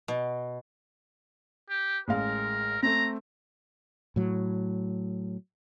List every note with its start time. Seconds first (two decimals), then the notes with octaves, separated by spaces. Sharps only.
0.08 B2
1.70 G4
2.08 A1 G#3 A#4 F5
2.83 A3 C4 A#5
4.16 A2 F#3